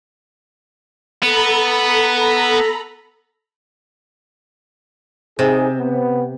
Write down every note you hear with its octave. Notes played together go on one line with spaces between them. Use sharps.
B3 A4 A#5 B5
C3 D#4 G#4
B3